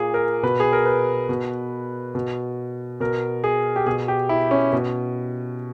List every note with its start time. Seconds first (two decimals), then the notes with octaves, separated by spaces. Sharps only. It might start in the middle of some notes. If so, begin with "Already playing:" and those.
Already playing: A#2 G#4
0.14 A#4
0.43 B2 B4
0.60 G#4
0.73 A#4
0.86 B4
1.29 B2
2.15 B2
3.00 B2 A#4
3.44 G#4
3.76 G4
3.86 B2 G#4
4.08 G4
4.29 E4
4.51 C#4
4.73 B2